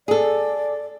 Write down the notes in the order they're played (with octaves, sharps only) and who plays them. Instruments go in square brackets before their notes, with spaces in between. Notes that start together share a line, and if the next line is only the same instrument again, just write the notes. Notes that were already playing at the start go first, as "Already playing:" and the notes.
[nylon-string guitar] G#4 A4 [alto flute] D5